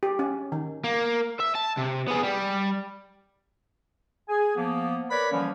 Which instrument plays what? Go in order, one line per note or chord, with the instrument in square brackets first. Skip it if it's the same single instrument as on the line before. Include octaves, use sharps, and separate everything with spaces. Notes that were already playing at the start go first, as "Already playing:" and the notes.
[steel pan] G4
C#4
D#3
[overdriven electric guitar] A#3
E5
A5
C3
B3 G#4
G3
[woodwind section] G#4 G#5
F3 A#3 B3
A#4 B4 C#5 D5 B5
D3 E3 F3 G3 A#3 C#4